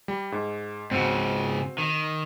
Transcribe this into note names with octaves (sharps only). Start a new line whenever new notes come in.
G3
G#2
G#2 C#3 C4 F#4
D#3